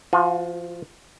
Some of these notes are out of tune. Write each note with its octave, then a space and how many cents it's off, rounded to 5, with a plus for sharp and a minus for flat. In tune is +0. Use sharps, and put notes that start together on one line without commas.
F3 -20 F4 +45